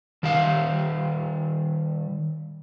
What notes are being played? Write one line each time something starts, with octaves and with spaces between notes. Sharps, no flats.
D#3 G3 F5